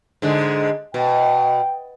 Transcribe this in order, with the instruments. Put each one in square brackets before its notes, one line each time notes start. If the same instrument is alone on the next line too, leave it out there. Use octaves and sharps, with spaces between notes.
[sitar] G#2 D3 G#3
[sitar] B2 [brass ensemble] G5